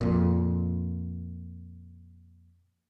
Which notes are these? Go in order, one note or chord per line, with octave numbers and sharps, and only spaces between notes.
F2 A#2